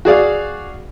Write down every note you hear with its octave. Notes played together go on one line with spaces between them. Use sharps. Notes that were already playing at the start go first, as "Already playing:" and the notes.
F#4 G#4 D5 F5